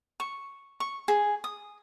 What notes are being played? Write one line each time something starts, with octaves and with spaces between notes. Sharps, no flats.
C#6
C#6
G#4
D#6